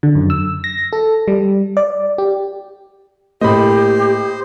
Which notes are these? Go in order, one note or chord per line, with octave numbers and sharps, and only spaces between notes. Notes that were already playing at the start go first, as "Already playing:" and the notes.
D3
F#2
E6
A#6
A4
G3
D5
G4
A2 A#3 G4 C5 D#5 B5